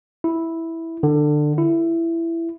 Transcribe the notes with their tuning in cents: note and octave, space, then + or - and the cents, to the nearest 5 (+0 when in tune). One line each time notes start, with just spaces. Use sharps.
E4 -5
D3 +25
E4 +15